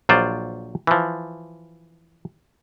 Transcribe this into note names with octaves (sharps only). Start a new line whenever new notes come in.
A#1 F#3 F4 C5 D5
E3 F3